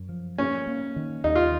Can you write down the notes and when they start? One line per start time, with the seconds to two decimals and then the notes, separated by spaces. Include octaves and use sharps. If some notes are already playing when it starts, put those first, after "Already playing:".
Already playing: F#2
0.09 F3
0.38 A#3 C#4
0.67 A#3
0.96 D#3
1.24 D#2 D#4
1.35 F4